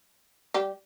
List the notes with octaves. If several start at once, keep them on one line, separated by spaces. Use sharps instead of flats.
G3 G4